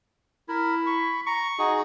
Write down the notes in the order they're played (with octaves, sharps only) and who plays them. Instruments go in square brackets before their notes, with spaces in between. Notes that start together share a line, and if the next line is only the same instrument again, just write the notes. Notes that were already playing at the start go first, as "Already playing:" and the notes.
[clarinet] E4 [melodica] A#4 B5
[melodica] B5 C#6
[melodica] A#5 [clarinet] C#6
[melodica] D#4 F#4 G#4